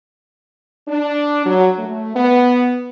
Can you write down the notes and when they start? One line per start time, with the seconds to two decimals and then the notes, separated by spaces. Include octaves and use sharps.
0.88 D4
1.46 F#3
1.77 A3
2.16 B3